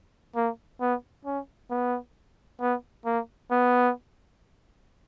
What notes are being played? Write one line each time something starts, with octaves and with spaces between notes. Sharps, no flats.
A#3
B3
C#4
B3
B3
A#3
B3